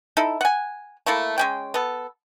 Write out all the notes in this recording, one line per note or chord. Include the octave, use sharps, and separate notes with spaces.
D#4 E4 A4
F#5 G#5
A3 A#3 E4 A4
G#3 C#4 G5
B3 A4